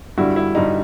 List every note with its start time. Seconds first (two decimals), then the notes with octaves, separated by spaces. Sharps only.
0.18 G2 D3 G3 E4 F#4
0.36 E4
0.55 G2 D3 G3 D#4